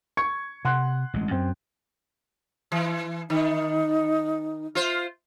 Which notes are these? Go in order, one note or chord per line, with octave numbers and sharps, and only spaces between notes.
C#6 G#6 C#7
C3 F#5 C6 F#6
A1 G#3
F#2 C4
E3
D#3 D#4
F4 C5